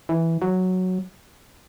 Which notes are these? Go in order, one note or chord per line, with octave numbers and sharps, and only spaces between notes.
E3
F#3